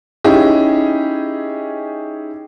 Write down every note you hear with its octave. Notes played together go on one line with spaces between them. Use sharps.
C#4 D#4 E4 G4 G#4